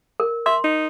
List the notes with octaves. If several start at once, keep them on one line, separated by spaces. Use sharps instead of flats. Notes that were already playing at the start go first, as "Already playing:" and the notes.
A#4
E5 C6
D#4